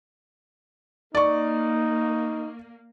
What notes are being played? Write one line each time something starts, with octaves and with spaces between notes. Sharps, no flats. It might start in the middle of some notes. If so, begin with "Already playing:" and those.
A#3 D#4 D5 C#6